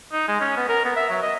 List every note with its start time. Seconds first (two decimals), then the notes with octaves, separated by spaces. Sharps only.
0.12 D#4
0.28 G#3
0.41 C#4
0.57 B3
0.69 A#4
0.85 B3
0.96 E5
1.10 F#3
1.22 D#5